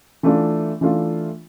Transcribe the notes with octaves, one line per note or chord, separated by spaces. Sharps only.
E3 A3 D4 F4
E3 A3 D4 F4